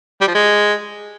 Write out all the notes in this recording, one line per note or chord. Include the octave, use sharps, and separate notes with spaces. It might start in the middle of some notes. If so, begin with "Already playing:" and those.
G3
F3
G#3